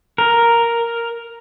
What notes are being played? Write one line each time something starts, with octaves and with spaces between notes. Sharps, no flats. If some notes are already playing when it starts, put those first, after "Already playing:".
A#4